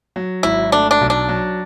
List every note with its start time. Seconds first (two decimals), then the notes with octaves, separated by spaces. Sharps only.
0.16 F#3
0.43 G#1 E4
0.72 A3 D4
0.91 D4
1.01 B1
1.10 D4
1.29 F#3